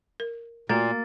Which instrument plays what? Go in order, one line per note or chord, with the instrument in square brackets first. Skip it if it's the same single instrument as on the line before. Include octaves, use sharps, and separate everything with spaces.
[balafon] A#4
[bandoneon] A#2 [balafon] A3 F#4 [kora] A#3 [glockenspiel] A6